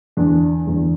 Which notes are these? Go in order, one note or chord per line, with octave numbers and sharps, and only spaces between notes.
E2 D3 D4
E2 D3